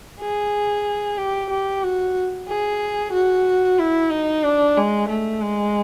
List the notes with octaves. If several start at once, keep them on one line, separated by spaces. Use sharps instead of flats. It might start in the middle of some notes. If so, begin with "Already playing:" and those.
G#4
G4
G4
F#4
G#4
F#4
E4
D#4
D4
G#3
A3
G#3